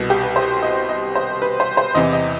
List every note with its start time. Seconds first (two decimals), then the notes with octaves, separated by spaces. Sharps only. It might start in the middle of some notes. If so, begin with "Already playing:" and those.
Already playing: C2 B2
0.10 G4
0.23 B4
0.36 C5
0.62 D#5
0.89 D#5
1.15 C5
1.42 B4
1.60 C5
1.77 C5
1.95 E2 C3 E3 D#5
2.13 D#5